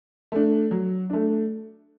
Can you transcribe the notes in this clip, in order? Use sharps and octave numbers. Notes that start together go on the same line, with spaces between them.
A3 D4
F#3
A3 D4